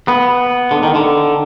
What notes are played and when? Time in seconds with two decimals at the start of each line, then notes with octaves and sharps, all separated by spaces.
0.08 B3
0.71 D3
0.83 D#3
0.95 D3